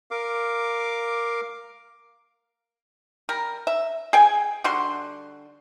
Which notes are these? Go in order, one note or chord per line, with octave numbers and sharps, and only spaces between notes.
A#4 F5 D6
G3 A#4
E5
G#4 G5 G#5
D3 G3 F#4 C6